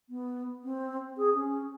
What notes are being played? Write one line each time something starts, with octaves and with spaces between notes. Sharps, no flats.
B3
C4
G#4
C#4